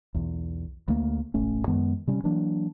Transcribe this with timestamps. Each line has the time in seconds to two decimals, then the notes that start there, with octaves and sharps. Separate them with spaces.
0.14 B1 E2
0.88 D2 A3 A#3
1.34 E1 A1 A3 C#4
1.68 F#2 D#3 G#3 B3
2.07 C3 G3 C#4
2.24 E3 F#3 A#3 D4